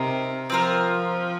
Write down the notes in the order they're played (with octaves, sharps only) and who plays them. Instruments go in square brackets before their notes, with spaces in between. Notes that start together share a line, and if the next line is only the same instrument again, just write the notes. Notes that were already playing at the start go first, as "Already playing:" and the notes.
Already playing: [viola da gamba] C3 [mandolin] D#4 A#4
[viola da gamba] F3 [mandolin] C4 F4 A#4